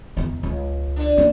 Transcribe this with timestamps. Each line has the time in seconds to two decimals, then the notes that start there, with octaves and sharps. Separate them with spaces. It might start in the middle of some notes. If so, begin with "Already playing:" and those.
0.17 E2 D#4
0.43 C#2
0.96 D3 D4
1.17 A#3 C#4